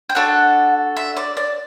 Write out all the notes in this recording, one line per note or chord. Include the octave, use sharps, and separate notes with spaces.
G5
D4 F#4 A4 F#5
E5
D5
D5